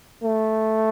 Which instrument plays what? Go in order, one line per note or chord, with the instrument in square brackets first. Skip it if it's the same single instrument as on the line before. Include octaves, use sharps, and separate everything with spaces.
[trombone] A3